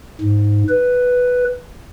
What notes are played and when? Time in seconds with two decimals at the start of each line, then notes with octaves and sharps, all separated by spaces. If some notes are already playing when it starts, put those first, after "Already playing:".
0.21 G#2
0.69 B4